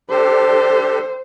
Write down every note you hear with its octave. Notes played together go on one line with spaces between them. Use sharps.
D4 G4 A4 C5